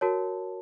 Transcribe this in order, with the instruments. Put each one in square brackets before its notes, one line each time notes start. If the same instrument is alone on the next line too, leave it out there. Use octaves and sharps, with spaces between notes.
[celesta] F#4 A#4 C#5 A5